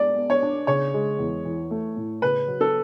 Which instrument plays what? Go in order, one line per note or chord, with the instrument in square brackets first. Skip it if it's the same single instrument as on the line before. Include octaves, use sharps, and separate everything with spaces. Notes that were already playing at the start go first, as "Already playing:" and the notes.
Already playing: [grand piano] G#3 [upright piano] D5
[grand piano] B3
[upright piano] C#5
[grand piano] D4
[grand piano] C#3 [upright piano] C#5
[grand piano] G#3
E2
E3
A3
A2
[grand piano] C#3 [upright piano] B4
[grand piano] F#3
[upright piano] A4